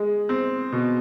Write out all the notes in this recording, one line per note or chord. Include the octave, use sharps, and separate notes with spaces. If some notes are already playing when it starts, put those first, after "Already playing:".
Already playing: G#3
C4
B2